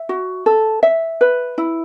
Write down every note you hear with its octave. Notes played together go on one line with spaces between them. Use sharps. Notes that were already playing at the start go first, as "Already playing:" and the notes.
Already playing: E5
F#4
A4
E5
B4
E4